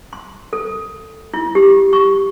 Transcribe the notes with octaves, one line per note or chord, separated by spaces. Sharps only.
C6
A4
E4
G4
C#6